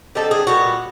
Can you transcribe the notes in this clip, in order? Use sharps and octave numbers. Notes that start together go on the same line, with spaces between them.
D3 G3 C4 D#4 A4
G#4
A#2 G3 B3 F#4